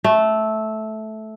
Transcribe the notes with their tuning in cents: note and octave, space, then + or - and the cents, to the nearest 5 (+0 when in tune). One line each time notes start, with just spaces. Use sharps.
A3 -10